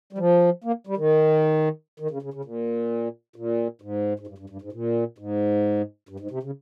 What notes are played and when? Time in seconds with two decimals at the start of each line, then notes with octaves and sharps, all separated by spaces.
0.13 G3
0.18 F3
0.64 A#3
0.87 G3
0.97 D#3
2.00 D#3
2.11 C#3
2.22 C#3
2.34 C#3
2.45 A#2
3.36 A#2
3.82 G#2
4.19 G#2
4.27 G2
4.38 G2
4.50 G2
4.62 G#2
4.72 A#2
5.18 G#2
6.09 G2
6.20 G#2
6.31 C3
6.43 C#3